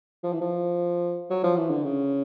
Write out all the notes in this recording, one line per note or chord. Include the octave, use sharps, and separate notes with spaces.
F3
E3
F3
F#3
F3
E3
D3
C#3